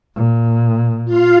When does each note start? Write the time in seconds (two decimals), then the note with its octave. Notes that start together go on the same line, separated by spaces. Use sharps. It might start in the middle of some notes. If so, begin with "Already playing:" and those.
0.16 A#2
1.05 F4 F5